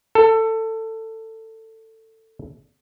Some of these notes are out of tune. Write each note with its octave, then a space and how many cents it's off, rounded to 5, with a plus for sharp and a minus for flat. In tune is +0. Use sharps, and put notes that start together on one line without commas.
A4 +20